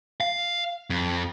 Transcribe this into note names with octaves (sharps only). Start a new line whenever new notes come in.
F5
F2